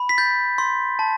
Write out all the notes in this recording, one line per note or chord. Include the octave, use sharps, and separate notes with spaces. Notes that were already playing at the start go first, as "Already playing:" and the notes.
Already playing: B5
B6
G6 A6
C6
A5